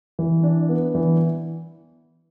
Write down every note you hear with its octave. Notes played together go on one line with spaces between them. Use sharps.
E3
D4
B3
E3